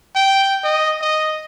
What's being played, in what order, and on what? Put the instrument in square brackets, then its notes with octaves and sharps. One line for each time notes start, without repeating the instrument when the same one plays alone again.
[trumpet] G5
D#5
D#5